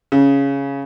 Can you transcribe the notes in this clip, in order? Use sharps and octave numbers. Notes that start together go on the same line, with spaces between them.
C#3